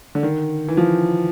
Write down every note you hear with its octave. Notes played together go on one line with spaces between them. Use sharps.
D3
D#3
E3
F3